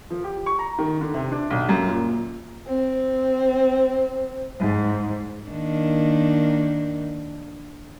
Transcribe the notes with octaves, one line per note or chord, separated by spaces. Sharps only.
F3
G4
C#6
A#5
D#3
D3
C3
D4
B1
F#2
A#2
C4
G#2
D#3 A#3 D4